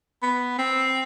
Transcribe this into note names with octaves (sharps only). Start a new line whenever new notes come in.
B3
C4